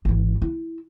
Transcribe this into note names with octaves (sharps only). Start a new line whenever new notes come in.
G#1 E3
E4